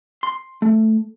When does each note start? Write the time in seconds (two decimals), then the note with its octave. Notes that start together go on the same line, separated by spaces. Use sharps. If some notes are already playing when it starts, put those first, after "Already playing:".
0.23 C6
0.62 A3